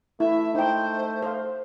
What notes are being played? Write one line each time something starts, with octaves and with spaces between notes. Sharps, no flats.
A3 E4 E5
D#4 C5 G5
C5 F5